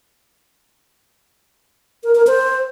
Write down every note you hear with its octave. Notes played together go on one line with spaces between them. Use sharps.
A#4
A#4
C5